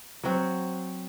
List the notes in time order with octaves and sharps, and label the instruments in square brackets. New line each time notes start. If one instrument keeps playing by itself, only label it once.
[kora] F#3 C4 F#4